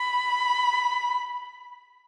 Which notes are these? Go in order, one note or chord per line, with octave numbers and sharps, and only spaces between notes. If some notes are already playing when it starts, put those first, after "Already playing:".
Already playing: B5